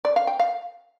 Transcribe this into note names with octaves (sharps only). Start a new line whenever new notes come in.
D5
F5
G5
F5